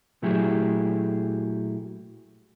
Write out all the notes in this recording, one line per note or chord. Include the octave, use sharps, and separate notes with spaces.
A#2 F#3 A3 E4 G4 G#4